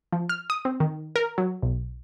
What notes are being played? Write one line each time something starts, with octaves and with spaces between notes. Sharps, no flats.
F3
F6
D#6
C4
D#3
A#4
F#3
B1